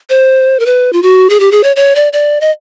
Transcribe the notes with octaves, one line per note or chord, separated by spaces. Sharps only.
C5
A#4
B4
F4
F#4
G#4
G4
G#4
C#5
C#5
D5
D5
D#5